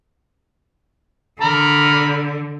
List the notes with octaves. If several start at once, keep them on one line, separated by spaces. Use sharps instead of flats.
D3 A#4 A#5 B5